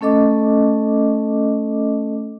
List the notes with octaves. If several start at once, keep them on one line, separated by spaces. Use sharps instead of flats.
A3 C#4 A4 D#5 D6